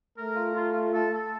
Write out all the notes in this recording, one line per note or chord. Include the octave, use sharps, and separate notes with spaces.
A3 A#4
F4
F4
F4
A4
A4